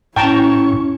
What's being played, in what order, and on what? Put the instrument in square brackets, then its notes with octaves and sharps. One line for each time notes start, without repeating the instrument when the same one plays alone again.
[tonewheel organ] A2 C#6 [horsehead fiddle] C#4 E4 [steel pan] G5 A5 A#5